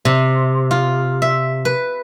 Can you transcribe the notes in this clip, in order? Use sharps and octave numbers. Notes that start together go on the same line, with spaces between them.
C3
F4
E5
B4